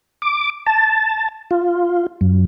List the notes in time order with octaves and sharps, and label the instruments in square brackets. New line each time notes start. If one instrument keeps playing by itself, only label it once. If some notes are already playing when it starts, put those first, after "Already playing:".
[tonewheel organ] D6
A5
F4
F#2